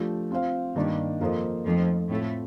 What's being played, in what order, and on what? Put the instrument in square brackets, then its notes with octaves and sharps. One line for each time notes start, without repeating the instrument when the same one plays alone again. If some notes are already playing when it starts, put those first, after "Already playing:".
Already playing: [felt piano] F3 A3 D4 G4
C4 F4 C5 F5
[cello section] G2 G3 [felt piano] D#3 A#3 D4
[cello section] F2 F3 [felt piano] A#3 F4 A4 C5 D#5
[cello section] F2 F3 [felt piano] A3 D#4 A4 D#5
[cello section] A2 A3 [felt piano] C4 F4 A4